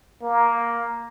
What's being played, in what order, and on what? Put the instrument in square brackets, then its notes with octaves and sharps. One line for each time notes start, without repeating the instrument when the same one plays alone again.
[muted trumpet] A#3